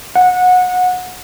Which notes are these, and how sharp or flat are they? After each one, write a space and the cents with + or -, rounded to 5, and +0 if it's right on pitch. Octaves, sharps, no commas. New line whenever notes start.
F#5 -25